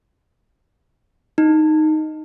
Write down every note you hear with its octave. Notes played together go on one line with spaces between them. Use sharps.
D#4